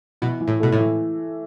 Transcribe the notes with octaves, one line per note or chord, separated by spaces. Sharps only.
B2 E3
E3
A2
B2 A3
A2
E3